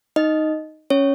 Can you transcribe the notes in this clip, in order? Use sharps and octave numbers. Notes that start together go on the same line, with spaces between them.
D#4 D#5
C#4 C#5